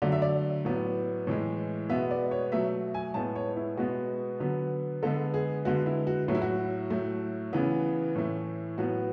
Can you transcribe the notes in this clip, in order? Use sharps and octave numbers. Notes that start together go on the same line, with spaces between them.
D3 F#3 A3 D5
E5
D5
A2 F#3 B3
A2 E3 G#3
B2 G#3 B3 E5
D5
C#5
B2 F#3 A3 E5
G#5
A2 G#3 B3 A5
C#5
E4
B2 G#3 B3 F#4
D3 F#3 B3
D3 G#3 B3 A4
G#4
D3 G#3 B3 F#4
E4
F#4
A2 F#3 A3 F#4
E4
F#4
A2 F#3 A3
C#3 E3 B3
A2 E3 A3
A2 F#3 B3 F#4